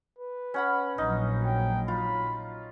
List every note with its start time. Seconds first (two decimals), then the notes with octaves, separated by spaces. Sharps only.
0.18 B4
0.54 C#4 F#5 B5
0.98 A#1 F#3 D#4
1.45 G5
1.88 F4 B5